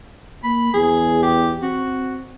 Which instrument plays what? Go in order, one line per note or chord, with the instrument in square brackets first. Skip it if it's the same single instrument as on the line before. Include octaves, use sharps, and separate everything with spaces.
[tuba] A#3 [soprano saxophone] B5
[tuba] E2 [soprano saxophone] G#4
[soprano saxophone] G4
[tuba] C4 [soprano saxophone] F#4